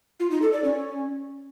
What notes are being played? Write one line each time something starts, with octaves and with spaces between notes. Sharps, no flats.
F4
D#4
A4
D5
C#4